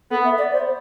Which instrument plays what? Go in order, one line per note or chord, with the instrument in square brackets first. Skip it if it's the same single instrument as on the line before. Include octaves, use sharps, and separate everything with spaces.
[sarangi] B3 [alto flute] A4
[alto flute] E5
D5
C5